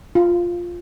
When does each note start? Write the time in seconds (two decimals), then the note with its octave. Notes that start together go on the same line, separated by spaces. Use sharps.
0.15 F4